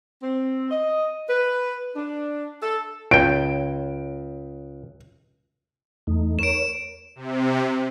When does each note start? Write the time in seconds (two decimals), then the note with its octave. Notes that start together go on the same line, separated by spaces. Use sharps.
0.23 C4
0.71 D#5
1.28 B4
1.96 D4
2.62 A4
3.11 C#2 G5 D7
6.07 E2 A3 D#4
6.39 A#4 C#5 D7 E7
7.16 C3